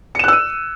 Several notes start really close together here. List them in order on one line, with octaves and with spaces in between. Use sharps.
C#7 E7 F#6 E6 D#7